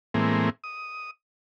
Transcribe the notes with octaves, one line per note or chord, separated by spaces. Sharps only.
A2 E3 G#3 A#3 C4
D#6